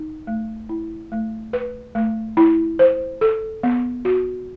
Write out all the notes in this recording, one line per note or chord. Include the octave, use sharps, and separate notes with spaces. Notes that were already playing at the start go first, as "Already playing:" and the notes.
Already playing: D#4
A3
E4
A3
B4
A3
E4
C5
A4
B3
F#4